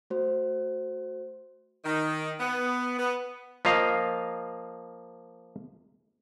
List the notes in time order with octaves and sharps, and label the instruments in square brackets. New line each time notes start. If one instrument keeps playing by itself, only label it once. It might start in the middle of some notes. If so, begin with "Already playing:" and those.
[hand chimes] A3 F#4 C5
[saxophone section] D#3
B3
B3
[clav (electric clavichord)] F3 A#3 D#5 F5